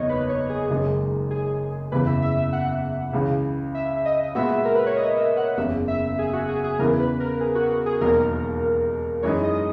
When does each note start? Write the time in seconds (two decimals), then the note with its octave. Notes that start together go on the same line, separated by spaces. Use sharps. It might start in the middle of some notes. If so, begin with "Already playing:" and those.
Already playing: F#1 E2 D#3 C#5 D#5
0.09 B4
0.29 C#5
0.49 G#4
0.70 F#1 F#2 D#3 G#3 D#4
1.31 G#4
1.91 F#1 E2 C#3 E3 B3 B4
2.06 E5
2.22 E5
2.37 E5
2.53 F#5
3.13 C#2 C#3 E3
3.75 E5
4.05 D#5
4.35 A#2 G#3 B3 F#4 E5
4.65 A#4
4.75 B4
4.86 C#5
4.96 D#5
5.17 E5
5.37 F#5
5.57 F#1 E2 C#3 E5
5.88 E5
6.19 G#4
6.33 F#4
6.49 G#4
6.64 G#4
6.79 E2 C#3 E3 B3 E4 A#4
7.00 B4
7.20 A#4
7.41 G#4
7.55 F#4
7.71 F#4
7.86 G#4
8.01 E1 D#2 D#3 F#3 A#3 A#4
9.23 F#2 E3 G#3 D#4 C#5
9.43 D#5